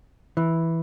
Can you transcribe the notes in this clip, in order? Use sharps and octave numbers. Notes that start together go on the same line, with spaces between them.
E3